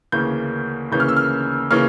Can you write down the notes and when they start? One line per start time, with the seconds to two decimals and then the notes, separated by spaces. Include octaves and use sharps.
0.12 D2 C#3 E3 A#3 C#4 G6
0.92 D2 C#3 E3 A#3 C#4 G6
1.00 F6
1.09 E6
1.17 F6
1.71 C#3 E3 A#3 C#4 F6